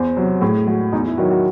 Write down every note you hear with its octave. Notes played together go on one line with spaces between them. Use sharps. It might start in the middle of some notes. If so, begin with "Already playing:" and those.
Already playing: E2 C5
C3 F#3
A2 G#4
G#3 F#4
E2 D#4
E4
D#3 F#3 F#4
F#4